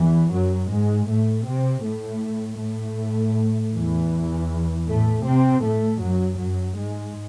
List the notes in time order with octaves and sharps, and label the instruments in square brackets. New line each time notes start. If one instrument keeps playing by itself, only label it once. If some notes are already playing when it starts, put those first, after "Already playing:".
Already playing: [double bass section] E2 E3
F#2 F#3
G#2 G#3
A2 A3
C3 C4
A2 A3
A2 A3
E2 E3
A2 A3
C3 C4
A2 A3
F#2 F#3
F#2 F#3
G#2 G#3